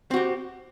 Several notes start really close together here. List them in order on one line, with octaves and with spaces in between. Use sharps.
C4 F#4 G4